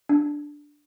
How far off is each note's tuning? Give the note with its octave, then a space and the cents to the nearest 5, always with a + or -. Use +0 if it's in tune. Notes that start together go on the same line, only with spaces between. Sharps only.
D4 +0